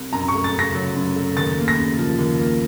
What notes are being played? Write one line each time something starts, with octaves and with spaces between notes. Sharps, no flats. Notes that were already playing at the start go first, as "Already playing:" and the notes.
Already playing: C2
F#2 A#5
C#6
A3
A6
C#3 A#6
F#3
F#2
A3
D#2 A6
A#3
A#6
C#3
F3
D#2
A#3